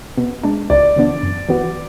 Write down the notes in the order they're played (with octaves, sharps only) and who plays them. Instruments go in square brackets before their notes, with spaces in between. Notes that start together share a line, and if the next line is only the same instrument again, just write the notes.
[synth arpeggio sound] B2
G#3 D4
[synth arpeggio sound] C#2 [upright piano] D5
[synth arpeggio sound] C#3 E3 B3 D4
F#2
E3 B3 F#4